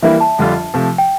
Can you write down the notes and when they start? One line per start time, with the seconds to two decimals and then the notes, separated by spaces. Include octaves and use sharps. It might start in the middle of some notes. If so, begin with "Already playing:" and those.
0.02 E3 G3 A#3 E4 E5
0.21 A5
0.38 F2 D3 G3 D4 F4
0.74 C3 F3 A3
0.98 G5